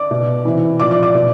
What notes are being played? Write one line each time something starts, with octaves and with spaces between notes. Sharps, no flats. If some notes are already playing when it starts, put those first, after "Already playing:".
Already playing: D5 D6
B2
C3 E3
A#2 F3 D5 D6
D5 D6
D5 D6
B2